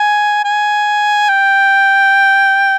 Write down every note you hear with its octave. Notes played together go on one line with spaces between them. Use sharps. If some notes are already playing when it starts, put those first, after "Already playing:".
Already playing: G#5
G#5
G5